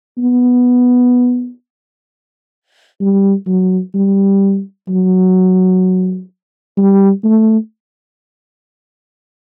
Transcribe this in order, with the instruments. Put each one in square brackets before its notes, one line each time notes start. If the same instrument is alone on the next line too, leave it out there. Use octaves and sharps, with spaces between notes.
[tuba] B3
G3
F#3
G3
F#3
G3
A3